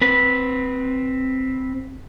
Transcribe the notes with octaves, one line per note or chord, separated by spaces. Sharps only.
C4 B4